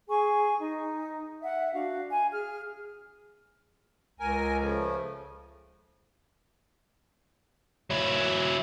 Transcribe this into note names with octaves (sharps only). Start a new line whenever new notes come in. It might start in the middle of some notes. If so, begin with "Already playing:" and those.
G#4 G#5 C#6
D#4
E5 F#5
D4 F#4 F5
G#5
G#4 F6
C#2 A#4 G#5
C#3 F3 A3
F#3 E4